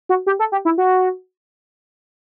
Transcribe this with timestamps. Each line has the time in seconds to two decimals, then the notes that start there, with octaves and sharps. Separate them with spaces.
0.09 F#4
0.27 G4
0.39 A4
0.52 G4
0.65 E4
0.78 F#4